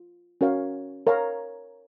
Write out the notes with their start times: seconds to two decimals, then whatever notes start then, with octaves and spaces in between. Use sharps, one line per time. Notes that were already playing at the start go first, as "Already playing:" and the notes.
Already playing: F4
0.41 C#4 F#4 A#4 C#5 F5
1.07 A#4 C#5 F5 A#5